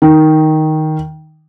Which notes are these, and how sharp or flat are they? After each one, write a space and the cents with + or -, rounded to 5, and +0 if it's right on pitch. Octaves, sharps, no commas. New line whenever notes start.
D#3 +5